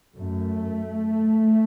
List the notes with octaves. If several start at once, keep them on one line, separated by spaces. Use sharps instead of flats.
F#2 A3